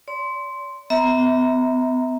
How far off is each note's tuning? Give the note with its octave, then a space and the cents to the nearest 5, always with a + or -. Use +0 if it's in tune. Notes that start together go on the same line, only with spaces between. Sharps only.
D5 -45 C6 +0
B3 +40 E5 -30 A#5 +5